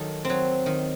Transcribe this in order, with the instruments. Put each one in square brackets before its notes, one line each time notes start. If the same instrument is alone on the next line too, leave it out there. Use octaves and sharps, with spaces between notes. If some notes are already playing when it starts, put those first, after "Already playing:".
Already playing: [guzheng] D#3 F#3 A4
C4
F#3
D#3